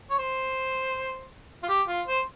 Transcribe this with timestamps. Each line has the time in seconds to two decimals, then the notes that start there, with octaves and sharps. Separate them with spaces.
0.10 C#5
0.18 C5
1.63 F4
1.69 G4
1.88 F4
2.07 C5